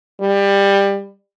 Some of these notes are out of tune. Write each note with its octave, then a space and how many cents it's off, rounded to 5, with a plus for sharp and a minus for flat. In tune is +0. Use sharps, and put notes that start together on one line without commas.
G3 +20